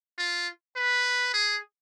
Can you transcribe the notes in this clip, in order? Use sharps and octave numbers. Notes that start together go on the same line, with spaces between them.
F4
B4
G#4